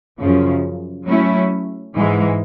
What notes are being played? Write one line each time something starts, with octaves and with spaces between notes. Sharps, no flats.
F#2 C#3 F3
F#3 A3 C#4 E4
G#2 E3 G#3